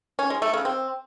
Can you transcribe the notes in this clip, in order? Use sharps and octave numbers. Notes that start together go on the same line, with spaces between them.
C#4
G#3
A3
C#3
C4